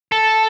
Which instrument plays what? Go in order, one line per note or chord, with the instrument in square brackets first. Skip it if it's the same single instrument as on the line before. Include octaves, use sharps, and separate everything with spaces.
[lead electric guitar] A4